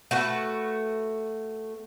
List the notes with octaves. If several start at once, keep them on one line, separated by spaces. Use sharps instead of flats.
A3 F#4 B4